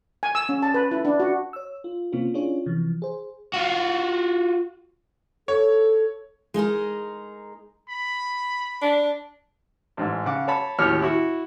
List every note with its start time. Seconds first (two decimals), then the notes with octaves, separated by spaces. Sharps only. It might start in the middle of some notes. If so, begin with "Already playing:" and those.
0.23 G#5
0.35 E6
0.49 C#4
0.62 A5
0.74 B4
0.91 E4
1.05 D4
1.20 F#4
1.53 C#5 E6
1.84 F4
2.12 C3 A#3 C4 C#4 F4
2.34 C#4 D4 E4 F4 G#4 C#5
2.66 C3 E3 F3
3.02 G#4 C5
3.53 F4 F#4
5.48 A4 C#5
6.54 G#3 D#4 G#4 A#4
7.89 B5
8.82 D4
9.97 A1 G#2
10.25 C#3 F#5 D6
10.48 C#5 A5 B5
10.79 D#2 A2 F#4 G4 C#5 F6
11.02 E4 F#4